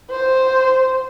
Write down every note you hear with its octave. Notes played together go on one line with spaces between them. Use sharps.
C5